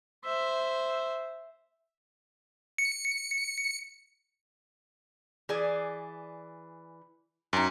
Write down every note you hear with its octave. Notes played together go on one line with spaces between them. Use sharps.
C5 E5
C#7
E3 G#4 D5
F#2 D#4 G5